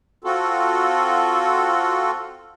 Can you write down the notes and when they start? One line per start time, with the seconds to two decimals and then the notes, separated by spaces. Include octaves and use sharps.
0.24 C4 F4 F#4 A4